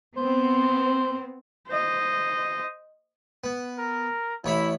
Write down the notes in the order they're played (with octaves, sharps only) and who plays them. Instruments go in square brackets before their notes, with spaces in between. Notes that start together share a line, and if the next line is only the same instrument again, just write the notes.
[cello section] B3 C4 [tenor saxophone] C5
[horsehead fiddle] C5 D#5
[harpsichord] B3
[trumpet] A#4
[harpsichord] A1 C#5 B5 [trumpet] E4